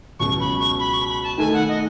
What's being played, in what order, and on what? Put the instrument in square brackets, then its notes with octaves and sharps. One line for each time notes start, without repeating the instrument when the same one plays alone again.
[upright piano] C#2 B2 F#3 C#4 [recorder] C#6
[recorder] B5
C#6
B5
C#6
B5
A5
[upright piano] D#3 A3 D#4 A4 [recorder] G#5
[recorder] F#5
D#5